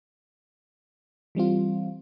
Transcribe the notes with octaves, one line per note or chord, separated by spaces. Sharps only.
E3 G3 C4 F4